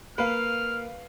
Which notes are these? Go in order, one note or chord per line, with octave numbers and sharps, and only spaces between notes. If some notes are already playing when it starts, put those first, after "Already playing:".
A#3 B4 F5 F6